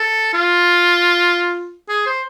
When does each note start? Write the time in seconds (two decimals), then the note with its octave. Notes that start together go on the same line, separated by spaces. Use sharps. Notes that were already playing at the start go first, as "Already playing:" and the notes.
Already playing: A4
0.33 F4
1.89 G#4
2.06 C5